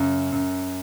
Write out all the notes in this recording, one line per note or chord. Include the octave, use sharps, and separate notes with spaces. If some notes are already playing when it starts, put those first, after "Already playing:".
Already playing: F#2 C#3
F#2